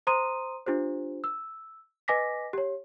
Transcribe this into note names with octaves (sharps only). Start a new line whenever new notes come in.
C5 A#5 C6 D#6 D#7
D4 F4 G4 C5
E6
B4 D#5 G#5 D6 A#6 B6
G4 C#5